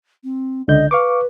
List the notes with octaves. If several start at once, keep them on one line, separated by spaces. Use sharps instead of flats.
C4
C#2 D3 D#5 G6
B4 F5 C#6 D6